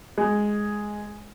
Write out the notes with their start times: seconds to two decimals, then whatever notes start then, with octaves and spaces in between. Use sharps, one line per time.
0.18 G#3